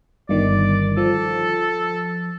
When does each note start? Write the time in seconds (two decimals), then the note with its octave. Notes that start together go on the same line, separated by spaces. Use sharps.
0.29 G1 D#3 D5
0.97 F3 A4